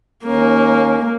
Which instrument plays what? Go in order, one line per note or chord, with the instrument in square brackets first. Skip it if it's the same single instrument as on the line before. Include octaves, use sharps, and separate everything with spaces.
[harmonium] D#2 C#4 [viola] A#3